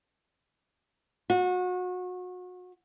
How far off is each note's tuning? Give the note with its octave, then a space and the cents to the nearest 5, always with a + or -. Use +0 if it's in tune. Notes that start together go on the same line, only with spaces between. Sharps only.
F#4 -30